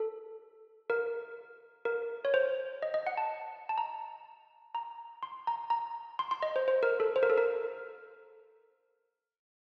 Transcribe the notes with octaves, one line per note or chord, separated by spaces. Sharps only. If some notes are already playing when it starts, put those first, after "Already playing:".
Already playing: A4
A#4
A#4
C#5
C5
D#5
D#5
F#5
A5
A5
A#5
A#5
C6
A#5
A#5
C6
C6
D#5
C5
C5
A#4
A4
C5
A#4
A4
A#4